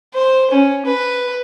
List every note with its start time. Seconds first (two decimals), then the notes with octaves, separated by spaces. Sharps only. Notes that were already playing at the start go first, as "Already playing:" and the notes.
0.15 C5
0.51 C#4
0.86 B4